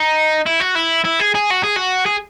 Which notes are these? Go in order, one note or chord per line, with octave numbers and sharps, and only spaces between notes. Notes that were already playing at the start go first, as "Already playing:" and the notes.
Already playing: D#4
E4
F#4
E4
E4
G#4
G#4
F#4
G#4
F#4
G#4